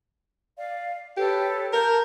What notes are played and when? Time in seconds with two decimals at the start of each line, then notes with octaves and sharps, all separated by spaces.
0.57 D5 F5
1.17 G4 A4 B4 C#5
1.73 A#4 A5 G6